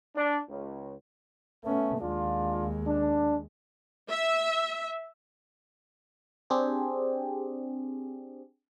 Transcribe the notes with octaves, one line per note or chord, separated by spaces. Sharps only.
D4
C#2
A3 B3 C#4
D#2 G#3 D4 F4
D4
E5
C4 D4 G4 G#4